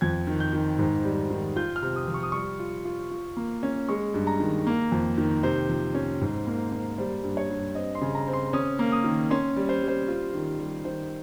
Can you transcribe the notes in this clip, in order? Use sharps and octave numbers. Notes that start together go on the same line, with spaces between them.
F2 G#6
D#3
G6
D#3
G#2
G3
D#3
F4 G6
F6
C3
D#6
F3
C#6
D#6
G3 C#6
F4
F4
F4
A#3
C#4
G#3 C#6
G2
A#5
D#3
A#3
F2
D#3
C3 C5
F3
C#4
G#2
A#3
A#3
G3 C5
G2
C#5
G2
C4 D#5
C6
C#3
A#5
C4
C6
C#4 D#6
A#3
D#6
D#3
C#4 C6
G3
C5
G3
C5
F4
D#3
G3
D#3 C5